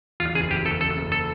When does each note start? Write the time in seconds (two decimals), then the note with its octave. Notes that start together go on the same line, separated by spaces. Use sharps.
0.20 E2 F4
0.35 F#1 G#4
0.50 F#1 G4
0.65 F#1 A4
0.81 F#1 A4
0.97 F#1
1.12 A4